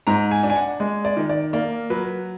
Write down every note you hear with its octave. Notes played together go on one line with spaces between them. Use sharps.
G#2 A#5
G#5
D4
G#5
F#5
G#3
D5
D#3
D5
A#3 D5
F#3 B4